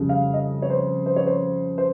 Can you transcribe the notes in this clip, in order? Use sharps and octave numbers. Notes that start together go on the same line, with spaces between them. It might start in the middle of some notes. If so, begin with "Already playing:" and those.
Already playing: F2 C#3 G3
F5
D#5
C#5
C5
C5
C#5
C5
C5